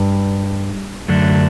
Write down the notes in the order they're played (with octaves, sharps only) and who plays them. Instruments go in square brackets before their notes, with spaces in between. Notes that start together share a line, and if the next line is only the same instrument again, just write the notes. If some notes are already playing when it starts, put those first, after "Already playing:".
Already playing: [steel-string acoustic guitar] G2
[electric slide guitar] F#2 D3 F#3 A3 D4